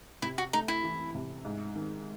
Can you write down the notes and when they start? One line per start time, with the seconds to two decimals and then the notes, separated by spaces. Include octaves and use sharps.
0.22 C3 E4
0.38 F#4
0.53 A3 D#4
0.68 E4
0.84 E3
1.15 C3
1.45 G#2
1.76 D#3